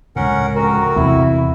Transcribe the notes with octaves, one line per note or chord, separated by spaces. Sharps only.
C#2 A2 C#4 A#4 F#5
F2 F#4 A#4
E2 C3 C4 E4